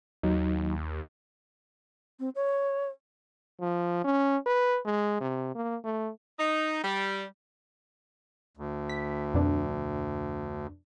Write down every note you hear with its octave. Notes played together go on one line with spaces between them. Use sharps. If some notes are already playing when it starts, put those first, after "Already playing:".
D#2 F#3 D#4
C4
C#5
F3
C#4
B4
G#3
C3
A#3
A3
D#4
G3
D2
B6
F2 B2 D4